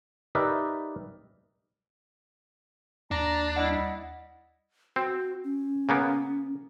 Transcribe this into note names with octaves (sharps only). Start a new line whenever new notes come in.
D#4 G4 A#4 B4 D5 E5
D#2 D4 A#5
G3 E4 D#5 F#5
C4 F#4
C#4
C#3 A#3 B3